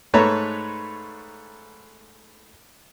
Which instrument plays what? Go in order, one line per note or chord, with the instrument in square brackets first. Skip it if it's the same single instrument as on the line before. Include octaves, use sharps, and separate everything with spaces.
[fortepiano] G#2 A3 B4 C#5 A5 A#5